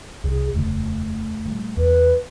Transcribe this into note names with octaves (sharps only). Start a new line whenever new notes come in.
C2 C3 G#4
D#1 F2 C#3 A3
A#2 F#3 G3
E2 B4